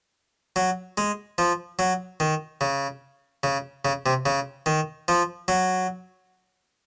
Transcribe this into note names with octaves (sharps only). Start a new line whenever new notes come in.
F#3
G#3
F3
F#3
D#3
C#3
C#3
C#3
C3
C#3
D#3
F3
F#3